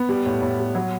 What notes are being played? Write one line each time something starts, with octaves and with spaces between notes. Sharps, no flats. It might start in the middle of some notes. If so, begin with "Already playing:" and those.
Already playing: B3
G3
A2
A2
G3
F#3